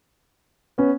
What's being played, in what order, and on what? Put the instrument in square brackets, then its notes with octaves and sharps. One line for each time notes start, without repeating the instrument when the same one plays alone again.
[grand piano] B3 C#4